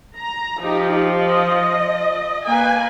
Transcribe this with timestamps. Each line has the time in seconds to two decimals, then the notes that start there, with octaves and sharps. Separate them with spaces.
0.16 A#5
0.61 F3 D#4 G4
1.26 D#5
2.47 A#3 B4 G#5